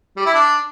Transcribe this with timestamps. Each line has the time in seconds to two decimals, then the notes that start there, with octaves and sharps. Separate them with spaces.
0.17 G3
0.25 E4
0.34 D4